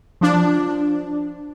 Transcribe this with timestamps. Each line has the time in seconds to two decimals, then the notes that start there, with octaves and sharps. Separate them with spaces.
0.21 F3 D4